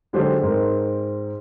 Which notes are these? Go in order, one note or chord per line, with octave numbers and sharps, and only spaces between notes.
D3 F#3 G#3 D4 G4 C5
G#2 C4 A#4